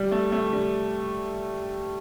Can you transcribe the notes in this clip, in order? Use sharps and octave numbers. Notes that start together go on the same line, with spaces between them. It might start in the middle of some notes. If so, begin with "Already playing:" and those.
Already playing: G3
A3
A3
G3